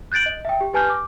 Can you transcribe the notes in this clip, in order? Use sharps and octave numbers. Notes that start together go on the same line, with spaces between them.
F#6 G6 A6 D7 F#7
D#5
E5 G5
G4
G4 B4 G#5 A5 F6 G6
D6